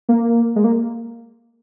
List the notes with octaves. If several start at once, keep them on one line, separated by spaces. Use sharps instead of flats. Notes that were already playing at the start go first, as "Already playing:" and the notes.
A#3
G#3
A#3